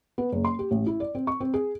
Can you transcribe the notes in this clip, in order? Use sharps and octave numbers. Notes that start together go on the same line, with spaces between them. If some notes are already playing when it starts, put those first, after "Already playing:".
B3
F#1
C6
G4
A1
E4
D5
C4
C#6
C4
G#4